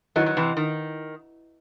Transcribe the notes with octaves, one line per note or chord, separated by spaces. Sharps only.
D#3 F#3 E4 B4 D#5
F#3
C3 E3
D#3